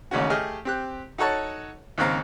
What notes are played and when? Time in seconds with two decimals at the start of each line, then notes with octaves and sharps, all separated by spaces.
0.11 A1 D#2 C#3 C#4 F#4
0.30 A3 G4 G#4 D#5 F6
0.65 C4 G4 F#6
1.18 D#4 F#4 A4 C#5 F#5 A5
1.98 D#2 G#2 C#3 C4 F5 A#5